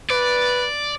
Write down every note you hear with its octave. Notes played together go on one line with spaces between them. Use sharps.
B4 D5